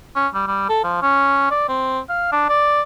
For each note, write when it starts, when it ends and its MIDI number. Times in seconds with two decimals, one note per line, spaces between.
0.16 0.28 61
0.34 0.44 55
0.47 0.68 55
0.69 0.79 69
0.84 1.01 53
1.02 1.51 61
1.51 1.67 74
1.69 1.99 60
2.09 2.30 77
2.32 2.47 62
2.49 2.82 74